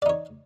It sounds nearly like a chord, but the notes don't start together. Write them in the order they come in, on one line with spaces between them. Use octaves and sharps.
D5 D#4 C#5